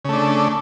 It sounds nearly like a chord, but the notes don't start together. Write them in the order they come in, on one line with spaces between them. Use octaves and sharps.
C#3 A3 D4